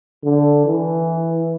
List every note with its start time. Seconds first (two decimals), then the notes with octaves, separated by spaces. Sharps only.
0.24 D3
0.65 E3